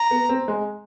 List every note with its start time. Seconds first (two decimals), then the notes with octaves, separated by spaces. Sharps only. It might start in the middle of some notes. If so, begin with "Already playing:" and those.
Already playing: A#5
0.11 B3
0.29 C4
0.48 G#3